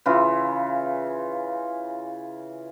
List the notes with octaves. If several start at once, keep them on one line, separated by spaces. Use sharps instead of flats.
C#3 E3 F4